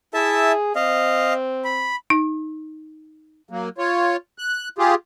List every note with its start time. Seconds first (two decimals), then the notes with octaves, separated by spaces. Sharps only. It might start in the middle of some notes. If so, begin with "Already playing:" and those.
0.14 E4 G#4 E5 A5
0.76 C4 D#5 F5
1.64 B5
2.10 D#4
3.50 F#3 A#3
3.78 F4 C#5
4.38 F#6
4.78 F4 G4 G#4